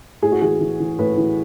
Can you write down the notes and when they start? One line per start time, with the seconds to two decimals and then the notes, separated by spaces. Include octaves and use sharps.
0.22 A2 G#4
0.32 F#4
0.41 E3 G#4
0.61 E3
0.80 E3
0.99 A2 B4
1.18 E3